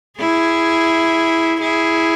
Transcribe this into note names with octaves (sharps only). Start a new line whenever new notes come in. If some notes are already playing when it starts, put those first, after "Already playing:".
E4 G#4
E4 G#4